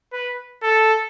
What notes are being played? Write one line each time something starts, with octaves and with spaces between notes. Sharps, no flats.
B4
A4